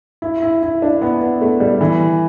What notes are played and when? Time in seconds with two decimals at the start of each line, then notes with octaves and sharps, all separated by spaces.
0.22 E4
0.42 E4
0.63 E4
0.82 D4
1.02 B3
1.21 B3
1.41 A3
1.60 G3
1.81 E3